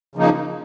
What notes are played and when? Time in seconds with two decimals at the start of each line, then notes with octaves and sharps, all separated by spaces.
0.15 C#3 F3 A#3 D#4